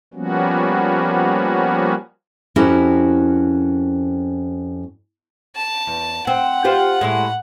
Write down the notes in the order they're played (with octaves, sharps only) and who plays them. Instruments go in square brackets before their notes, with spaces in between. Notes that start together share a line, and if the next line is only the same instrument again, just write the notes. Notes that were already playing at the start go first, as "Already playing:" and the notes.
[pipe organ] F3 G3 A#3 B3 C#4 F#4
[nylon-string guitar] F2 C#4 E4 F#4 G4 A#4
[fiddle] A5
[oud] E2
[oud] C4 [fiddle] F#5
[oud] F4 G4 C5
A2 G#3 E4